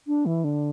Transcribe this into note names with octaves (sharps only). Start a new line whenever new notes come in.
D4
E3
D3